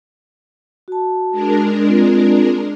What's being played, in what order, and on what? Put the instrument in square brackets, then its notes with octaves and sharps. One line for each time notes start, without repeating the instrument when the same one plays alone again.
[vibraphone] F#4 A5
[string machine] G#3 D4 A#4
[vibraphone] C4 F4